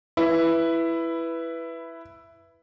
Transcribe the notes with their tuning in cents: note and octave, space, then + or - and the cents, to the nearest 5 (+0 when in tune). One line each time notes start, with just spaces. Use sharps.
E4 +10 B4 +0